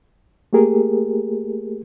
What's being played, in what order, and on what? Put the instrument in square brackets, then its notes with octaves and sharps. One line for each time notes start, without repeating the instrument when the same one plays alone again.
[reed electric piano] A3 A#3 G4 G#4 A#4